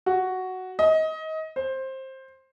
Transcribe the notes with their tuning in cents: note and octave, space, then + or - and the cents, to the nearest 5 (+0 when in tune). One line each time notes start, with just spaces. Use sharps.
F#4 +5
D#5 +25
C5 +15